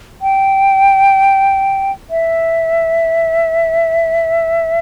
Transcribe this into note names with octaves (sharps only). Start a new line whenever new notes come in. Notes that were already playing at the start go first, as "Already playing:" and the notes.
G5
E5